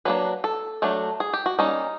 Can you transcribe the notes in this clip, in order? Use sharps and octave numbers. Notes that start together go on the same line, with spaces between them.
F#3 A#3 D4 B4
A4
F#3 A3 D4
G#4
G4
F#4
G3 A#3 C#4 D#4